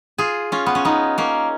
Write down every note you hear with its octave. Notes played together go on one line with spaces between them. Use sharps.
F4 G#4
C#4 F4
B3
C#4
B3 D#4
A#3 C#4